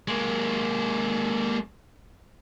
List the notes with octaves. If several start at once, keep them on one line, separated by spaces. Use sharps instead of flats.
G#3 A#3